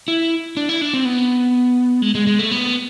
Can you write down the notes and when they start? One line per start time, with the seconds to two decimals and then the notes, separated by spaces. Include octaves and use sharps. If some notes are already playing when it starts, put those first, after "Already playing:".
0.08 E4
0.57 D4
0.69 E4
0.81 D4
0.94 C4
1.05 B3
2.02 G#3
2.15 G#3
2.27 G#3
2.39 A3
2.51 B3